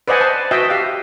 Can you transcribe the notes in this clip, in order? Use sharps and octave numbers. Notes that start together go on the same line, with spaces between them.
B4 C5 D5 D#5 F#5 G#5
A5
F#4 B4 D#5 E5 G5 A5
G4 F5